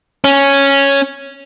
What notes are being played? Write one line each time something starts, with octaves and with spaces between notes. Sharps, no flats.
C#4